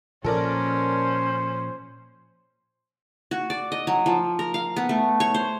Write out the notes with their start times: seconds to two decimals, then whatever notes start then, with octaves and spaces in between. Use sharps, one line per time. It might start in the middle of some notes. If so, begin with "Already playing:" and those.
0.24 A#2 F3 C#4 A4 A#4 C5 D5
3.31 F#4
3.50 D5
3.72 D#5
3.87 F#3
4.06 F3
4.39 A#4
4.54 F5
4.76 B3
4.89 A3
5.20 C#5
5.34 C5